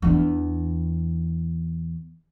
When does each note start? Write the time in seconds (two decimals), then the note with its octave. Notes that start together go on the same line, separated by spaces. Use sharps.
0.02 E2 D4